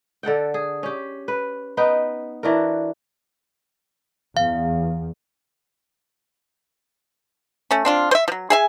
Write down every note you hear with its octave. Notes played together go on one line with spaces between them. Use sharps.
D3 A4 F#5 G5
G#4
C#4 G4
B4
B3 D#4 B4 G5
E3 D4 F#4 A#4
E2 F5
A3 C#4
C4 D4 F4
C5 E5
F3 F#3
G#4 E5 G#5